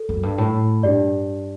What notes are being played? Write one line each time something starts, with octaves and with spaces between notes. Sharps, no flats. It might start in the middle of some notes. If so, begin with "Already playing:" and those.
Already playing: A4
F#2
G2
A2
G2 D4 G4 D5